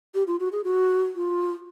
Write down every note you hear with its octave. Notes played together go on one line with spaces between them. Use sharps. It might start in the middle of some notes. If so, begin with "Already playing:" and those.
G4
F4
F#4
G#4
F#4
F4